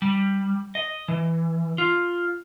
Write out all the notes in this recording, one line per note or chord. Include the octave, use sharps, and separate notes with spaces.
G3
D#5
E3
F4